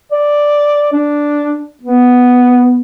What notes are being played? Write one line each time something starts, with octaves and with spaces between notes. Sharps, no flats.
D5
D4
B3